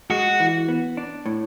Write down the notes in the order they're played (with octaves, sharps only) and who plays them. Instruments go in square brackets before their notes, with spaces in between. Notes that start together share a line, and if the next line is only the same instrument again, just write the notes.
[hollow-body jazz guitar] G#3 [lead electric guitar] F#4
[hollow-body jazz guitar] E3
B3
D4
A2